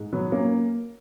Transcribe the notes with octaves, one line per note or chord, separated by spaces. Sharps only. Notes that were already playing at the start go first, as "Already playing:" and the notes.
Already playing: G#2
F#3 B3
A#3 C#4